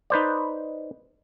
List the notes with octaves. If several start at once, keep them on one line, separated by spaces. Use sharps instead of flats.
D#4 B4 C5 D5